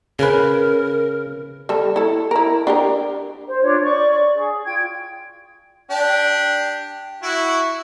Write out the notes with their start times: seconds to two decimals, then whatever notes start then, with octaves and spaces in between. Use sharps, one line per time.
0.19 C#3 A#4 B4
1.69 G3 A4
1.96 E4 A4
2.31 E4 A#4
2.67 D4 G4 A#4
3.47 C5
3.62 D4 F4 C#5
3.83 D5 C#6
4.34 G#4
4.65 F4 G5 G#6
5.90 D4 G4
7.22 E4 F#4